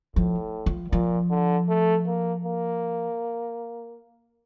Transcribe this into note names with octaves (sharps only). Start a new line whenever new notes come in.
A2 F3
F3
A#2 F3
D3
A3
A#3
A#3